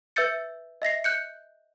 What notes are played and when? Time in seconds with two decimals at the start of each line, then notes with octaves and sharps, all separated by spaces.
0.16 B4 E5 E6 G6 A6 C#7
0.82 D#5 E5 A#6 C7
1.04 F#6 G6 C#7